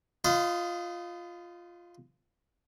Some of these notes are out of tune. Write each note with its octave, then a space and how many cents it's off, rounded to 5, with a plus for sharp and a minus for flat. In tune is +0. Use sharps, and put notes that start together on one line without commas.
F4 +0 C5 -45 D#5 +0